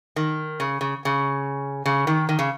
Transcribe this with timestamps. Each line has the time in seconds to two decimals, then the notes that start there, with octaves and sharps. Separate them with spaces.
0.16 D#3
0.60 C#3
0.81 C#3
1.05 C#3
1.86 C#3
2.07 D#3
2.29 D#3
2.39 C#3